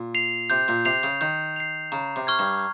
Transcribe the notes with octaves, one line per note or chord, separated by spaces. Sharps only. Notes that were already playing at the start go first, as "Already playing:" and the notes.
Already playing: A#2
C7 F7
C3 G6
A#2
C3 C7 F7
C#3
D#3 G6
C7 F7
C#3 A#5
C3
C#6 F6 G#6
G2